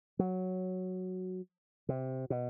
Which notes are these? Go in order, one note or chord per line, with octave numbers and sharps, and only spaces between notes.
F#3
C3
B2